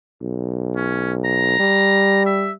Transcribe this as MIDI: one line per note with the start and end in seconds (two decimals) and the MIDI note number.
0.21 1.54 35
0.76 1.12 61
1.25 2.23 82
1.60 2.54 55
2.26 2.52 76